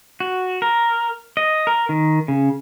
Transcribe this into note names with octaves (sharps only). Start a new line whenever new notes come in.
F#4
A#4
D#5
A#4
D#3
C#3